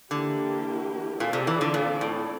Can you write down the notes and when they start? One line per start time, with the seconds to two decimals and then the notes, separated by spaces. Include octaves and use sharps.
0.11 D3 E3 A#3 E4 G4
1.20 A#2 C4 F4 A4 D5
1.33 C3
1.47 E3
1.61 D3
1.74 A#2
2.01 A2